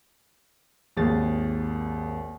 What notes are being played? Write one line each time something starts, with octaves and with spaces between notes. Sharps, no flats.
G#1 D#2 G#4 A6